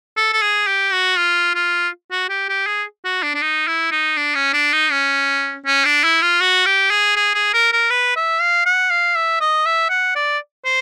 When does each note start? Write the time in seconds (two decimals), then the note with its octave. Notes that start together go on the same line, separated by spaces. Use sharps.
0.17 A4
0.33 A4
0.42 G#4
0.67 G4
0.92 F#4
1.17 F4
1.55 F4
2.11 F#4
2.29 G4
2.49 G4
2.66 G#4
3.05 F#4
3.23 D4
3.35 D4
3.42 D#4
3.67 E4
3.91 D#4
4.17 D4
4.35 C#4
4.53 D4
4.73 D#4
4.91 C#4
5.66 C#4
5.85 D4
6.04 E4
6.22 F4
6.41 F#4
6.66 G4
6.91 G#4
7.16 G#4
7.34 G#4
7.54 A#4
7.73 A#4
7.90 B4
8.16 E5
8.40 F5
8.66 F#5
8.91 F5
9.15 E5
9.41 D#5
9.65 E5
9.90 F#5
10.16 D5
10.65 C5